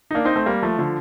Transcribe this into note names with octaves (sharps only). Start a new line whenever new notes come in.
D#4
A#3 D4
C4 D#4
A3 C4
G3 A#3
F3 A3
D3 F3